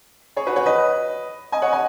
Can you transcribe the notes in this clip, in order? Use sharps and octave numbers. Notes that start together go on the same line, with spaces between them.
G#4 C#5
F#4 B4
C#5 F#5
B4 D#5
D#5 G#5
C#5 F#5
D#5 G#5